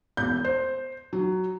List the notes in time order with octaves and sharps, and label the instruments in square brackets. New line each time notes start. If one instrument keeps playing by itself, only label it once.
[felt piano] E1 [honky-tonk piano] G6
[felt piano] C5
F#3